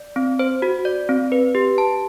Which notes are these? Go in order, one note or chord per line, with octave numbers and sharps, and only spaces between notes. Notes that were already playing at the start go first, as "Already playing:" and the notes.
Already playing: D5
C4
C5
F#4
D5
C4
B4
G4
A5